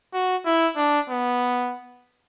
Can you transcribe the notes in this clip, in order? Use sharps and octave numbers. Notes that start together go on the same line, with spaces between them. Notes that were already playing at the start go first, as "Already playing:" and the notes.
F#4
E4
D4
B3